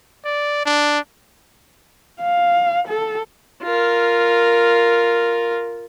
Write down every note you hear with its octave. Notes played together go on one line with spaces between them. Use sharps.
D5
D4
F5
A4
F4 A#4